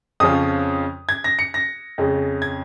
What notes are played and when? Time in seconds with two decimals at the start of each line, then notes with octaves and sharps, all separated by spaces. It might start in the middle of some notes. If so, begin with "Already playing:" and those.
0.20 F2 C#3 F3 C#4 F4 D#6
1.09 G#6
1.24 A#6
1.39 C#7
1.54 A#6
1.98 F2 C#3 G#3
2.42 G#6